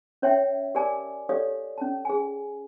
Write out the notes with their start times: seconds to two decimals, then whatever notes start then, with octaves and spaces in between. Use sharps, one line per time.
0.22 C#4 C#5 E5 G5
0.75 G4 A#4 D5 G#5 A5 D6
1.29 G4 A4 C#5 D5 F5 D#6
1.78 C#4 A5
2.05 G#4 G#5